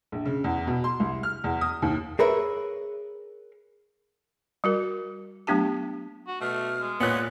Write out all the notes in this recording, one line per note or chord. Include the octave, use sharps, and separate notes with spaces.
A#1
C#3
E2
B2
C6
C2
F6
E2
D#6
D#2
G#4 A#4 B4 C#5 E5
G3 F#4 A#4
F#3 A3 B3 D4 G4 A5
F#4
B2 A3 F6
G#3
A#2 B3 C#5 F#6